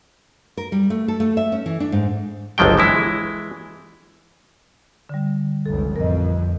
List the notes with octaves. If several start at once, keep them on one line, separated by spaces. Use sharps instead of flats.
A#4
G3
A3
A4
A3
E5
C#4
E3
D4
G#2
G1 C#2 F3 F#3 G5
E3 G#3 E4
D3 G3
F1 C#2 A4
A1 F2 A#4 D#5